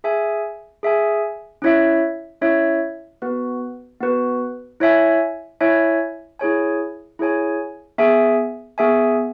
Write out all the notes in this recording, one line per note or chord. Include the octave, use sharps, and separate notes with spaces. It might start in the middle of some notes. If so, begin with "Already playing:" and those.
G#4 E5 G#5
G#4 E5 G#5
C#4 E4 C#5 E5
C#4 E4 C#5 E5
B3 F#4 B4
B3 F#4 B4
E4 C#5 E5 G#5
E4 C#5 E5 G#5
E4 G#4 C#5 G#5
E4 G#4 C#5 G#5
B3 G#4 E5 G#5
B3 G#4 E5 G#5